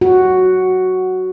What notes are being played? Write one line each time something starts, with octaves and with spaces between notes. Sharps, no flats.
F#4